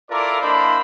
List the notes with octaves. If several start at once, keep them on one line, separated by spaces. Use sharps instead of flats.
E4 F4 A4 A#4 D5
A#3 D4 E4 C5 D#5 B5